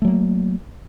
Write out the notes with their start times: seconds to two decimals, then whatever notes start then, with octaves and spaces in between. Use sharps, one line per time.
0.02 A3
0.05 F#3
0.08 A#3